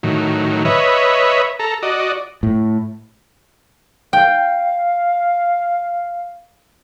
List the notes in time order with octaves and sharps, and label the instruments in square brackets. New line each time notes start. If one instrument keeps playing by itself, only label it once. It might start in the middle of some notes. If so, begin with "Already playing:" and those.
[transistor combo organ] A2 D#3 F#3
B4 C#5 D#5 E5
A4 A#5
F#4 D5 D#5
[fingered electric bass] A2
[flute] F5 [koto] G5